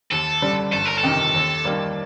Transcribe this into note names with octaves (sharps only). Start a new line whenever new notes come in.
D#2 A4
D3 G3
G1 A4
A#4
A4
F2 C3 D#3
D#2
D#3 G3 A#3